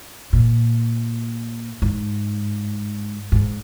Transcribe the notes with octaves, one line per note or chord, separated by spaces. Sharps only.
A#2
G#2
G#2